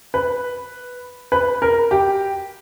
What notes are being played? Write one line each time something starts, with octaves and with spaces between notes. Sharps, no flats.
B4
B4
A#4
G4